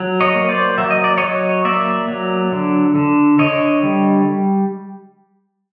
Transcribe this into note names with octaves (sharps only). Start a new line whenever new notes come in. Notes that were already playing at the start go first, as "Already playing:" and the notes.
Already playing: F#3
C#5 D#5
A#3
C5 D5
F#3 E5
D#5
D5
F#3 C#5 D#5
A#3 D5 E5
F#3
D3
D3
D3 C#5 D#5
G3